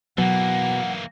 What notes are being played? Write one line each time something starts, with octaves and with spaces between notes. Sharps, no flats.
B2 E3 F#3 A#3 F#5